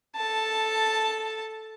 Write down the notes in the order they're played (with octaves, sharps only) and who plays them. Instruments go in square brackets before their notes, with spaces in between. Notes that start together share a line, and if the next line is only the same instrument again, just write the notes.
[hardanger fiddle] A4 A5